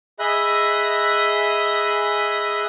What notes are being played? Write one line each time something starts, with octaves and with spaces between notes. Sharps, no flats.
G#4 D#5 E5 B5 D#6 F#6